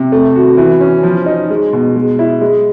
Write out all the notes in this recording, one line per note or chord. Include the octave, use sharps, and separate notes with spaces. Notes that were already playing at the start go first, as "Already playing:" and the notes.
Already playing: C3
A3
F#4
E3
C#4
F3
D#4
G#3
B2
G#3
E4
G#3